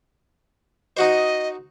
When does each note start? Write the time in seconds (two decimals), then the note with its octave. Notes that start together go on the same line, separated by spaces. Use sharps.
0.97 D#4 F#4 C5 D#5